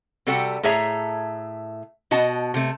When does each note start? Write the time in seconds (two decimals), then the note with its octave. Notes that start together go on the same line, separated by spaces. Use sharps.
0.27 C3 G3 F#4 A4 F#5 G5
0.63 A2 A3 G#4 C#5 E5 A#5
2.11 B2 F#4 D#5 A5
2.54 C3 A3